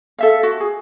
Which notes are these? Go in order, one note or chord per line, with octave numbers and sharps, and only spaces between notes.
A4 E5 F5
F#4
G#4